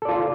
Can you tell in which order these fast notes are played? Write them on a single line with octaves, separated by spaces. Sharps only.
A4 D5 F4